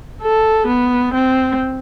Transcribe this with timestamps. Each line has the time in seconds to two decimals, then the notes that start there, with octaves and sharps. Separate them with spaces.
0.23 A4
0.68 B3
1.14 C4